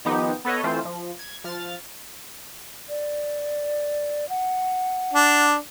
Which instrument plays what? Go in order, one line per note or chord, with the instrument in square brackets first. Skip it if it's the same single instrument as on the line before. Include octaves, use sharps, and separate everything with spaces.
[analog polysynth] D#3 F3 B3 D#4 G4
B3 A4 B4 C#5 D#5
E3 A3 C4 F4 C5
F3
G#6
F3 F6 A6
[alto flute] D5
F#5
[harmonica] D4